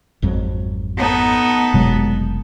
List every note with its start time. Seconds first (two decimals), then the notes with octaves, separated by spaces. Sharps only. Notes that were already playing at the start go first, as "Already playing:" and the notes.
0.22 G#1 F2 F#3
0.97 B3 D#4 A4
1.74 F1 B2 F#3 G#3